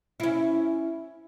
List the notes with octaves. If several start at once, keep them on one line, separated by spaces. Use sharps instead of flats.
C#4 E4